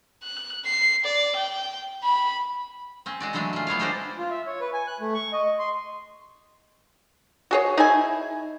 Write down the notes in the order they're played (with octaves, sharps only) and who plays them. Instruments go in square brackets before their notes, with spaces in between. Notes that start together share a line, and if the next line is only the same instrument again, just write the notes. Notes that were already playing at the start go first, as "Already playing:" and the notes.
[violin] F#6
C7
D5
G5
B5
[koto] C4 C#4
G#3 F#4 D5
D3 E3 F#3 G#3 A3 D4
A3 F4
A3 B3 C#5 F5
G#3 D4 G4 A4 C5 D5
[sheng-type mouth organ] F4
E5
C#5
B4
G#5
F#6
A3
C#6
D#5
C6
[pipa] F#4 G#4 C#5
D#4 E4 G#5